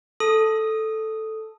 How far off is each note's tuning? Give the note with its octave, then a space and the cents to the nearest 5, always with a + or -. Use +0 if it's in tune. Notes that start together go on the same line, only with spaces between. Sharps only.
A4 +0 D#6 +0